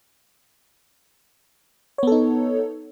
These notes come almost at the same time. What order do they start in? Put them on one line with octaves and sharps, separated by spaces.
C#5 B3 A4 D#4